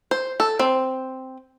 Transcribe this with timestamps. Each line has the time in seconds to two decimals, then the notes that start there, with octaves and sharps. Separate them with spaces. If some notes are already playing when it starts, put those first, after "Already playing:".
0.11 C5
0.40 A4
0.59 C4